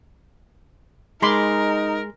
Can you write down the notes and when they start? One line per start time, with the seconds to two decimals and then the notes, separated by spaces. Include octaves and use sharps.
1.22 G#3 D#4 A#4 B5 C6 D6